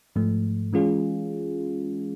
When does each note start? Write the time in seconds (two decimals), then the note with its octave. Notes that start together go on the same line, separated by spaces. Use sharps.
0.16 G#2 F3 A3
0.73 E3 G#3 C#4 F4 G#4